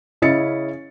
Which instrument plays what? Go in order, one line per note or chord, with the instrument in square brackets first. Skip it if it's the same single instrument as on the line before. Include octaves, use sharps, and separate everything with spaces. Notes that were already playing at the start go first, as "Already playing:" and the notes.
[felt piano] C#3 C#4 E4 D#5 A6 C#7